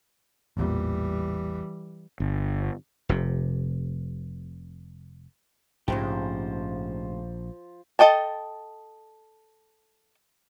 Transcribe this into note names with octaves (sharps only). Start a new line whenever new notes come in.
A1 E2 A#2 E3 G3
G1
F1 C3
A#1 G#2 C#3 F3 A3 G4 C5
A4 D#5 G5 A5